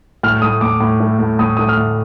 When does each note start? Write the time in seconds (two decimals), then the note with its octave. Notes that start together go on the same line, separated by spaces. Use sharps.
0.23 A2 F6
0.42 A3 D#6
0.61 A2 D6
0.81 A2
1.00 A3
1.19 A2
1.39 A2 D#6
1.57 A3 D#6
1.69 F6
1.77 A2